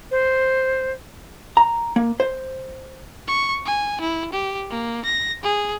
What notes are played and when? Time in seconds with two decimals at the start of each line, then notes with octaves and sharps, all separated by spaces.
0.11 C5
1.57 A#5
1.96 A#3
2.20 C5
3.27 C#6
3.65 G#5
4.01 E4
4.32 G4
4.70 A#3
5.05 A#6
5.43 G#4